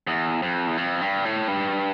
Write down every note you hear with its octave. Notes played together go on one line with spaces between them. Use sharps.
E2
F2
E2
F2
G2
A2
G2